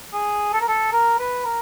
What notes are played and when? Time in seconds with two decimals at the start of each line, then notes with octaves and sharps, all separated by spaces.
0.13 G#4
0.53 A4
0.61 A#4
0.68 A4
0.92 A#4
1.19 B4
1.45 A#4